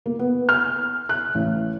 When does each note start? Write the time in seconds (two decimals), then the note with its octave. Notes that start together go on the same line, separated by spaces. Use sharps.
0.06 A#3
0.19 B3
0.49 F6
1.09 F#6
1.35 A1